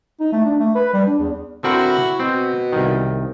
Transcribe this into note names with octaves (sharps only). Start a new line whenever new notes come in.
D#4
A3
D4
A3
B4
G3
D4
E2
D3 C4 E4 F#4 A#4
B2 C4
C2 D#3